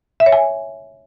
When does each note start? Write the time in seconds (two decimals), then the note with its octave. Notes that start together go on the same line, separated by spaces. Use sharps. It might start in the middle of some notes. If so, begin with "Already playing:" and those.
0.20 E5
0.26 C#5
0.32 G#5